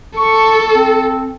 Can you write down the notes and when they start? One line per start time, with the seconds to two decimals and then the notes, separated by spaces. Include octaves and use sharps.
0.17 A4 C#6
0.75 C4